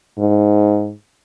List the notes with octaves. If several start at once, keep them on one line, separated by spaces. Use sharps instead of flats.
G#2